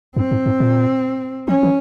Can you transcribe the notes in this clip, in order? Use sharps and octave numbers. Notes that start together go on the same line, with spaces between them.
G2 C4
G#2
G#2
A#2
F3 C#4
E3